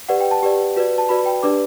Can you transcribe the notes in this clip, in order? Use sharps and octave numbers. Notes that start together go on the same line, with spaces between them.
G4 B4 D5 F#5
G5
A5
G4 B4 D5
F#4 B4 D5
A5
F#4 B4 D5 B5
G5
D4 G4 B4 D5 D6